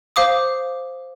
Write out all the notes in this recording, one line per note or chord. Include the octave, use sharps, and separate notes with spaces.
C5 F5 D6 D#6